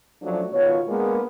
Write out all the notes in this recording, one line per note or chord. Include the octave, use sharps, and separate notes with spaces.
F3 F#3 A3 C#4 D4
B2 D#3 F4 C#5
G#3 A#3 B3 D4 G#4 A#4